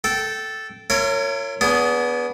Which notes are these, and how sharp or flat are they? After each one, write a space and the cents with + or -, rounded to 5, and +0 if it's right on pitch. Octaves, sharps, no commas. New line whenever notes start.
A4 -5 G5 -20
E4 +40 A#4 -30 C#5 +0
B3 -10 D4 -35 G#4 +0